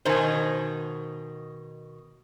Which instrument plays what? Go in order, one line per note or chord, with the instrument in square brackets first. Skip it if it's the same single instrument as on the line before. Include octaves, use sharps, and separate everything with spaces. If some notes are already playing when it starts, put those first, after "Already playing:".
[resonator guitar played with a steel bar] B2 D#3 [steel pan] C5 G#5